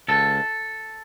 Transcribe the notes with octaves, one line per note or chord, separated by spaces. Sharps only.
C#2 A4